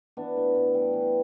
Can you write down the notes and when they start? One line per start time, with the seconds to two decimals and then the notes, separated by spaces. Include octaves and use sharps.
0.17 E3 B3 D4
0.36 A2
0.55 A2
0.74 G3
0.93 E3